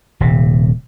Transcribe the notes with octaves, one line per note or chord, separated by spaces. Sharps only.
D#1 C3